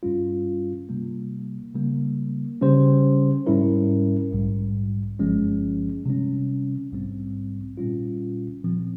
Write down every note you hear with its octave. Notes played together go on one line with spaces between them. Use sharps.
G2 G3 C#4 F4
C3 G3 A#3
C#3 G3 A#3
C#3 G3 C#4 G4 C5
G#2 G3 C#4 E4 A#4
A#1 G#2 G3
G1 G2 F3 G#3 C#4
C3 G3 C#4
A#1 G#2 G3 C4
A#2 G3 C#4 F4
A#2 F3 C4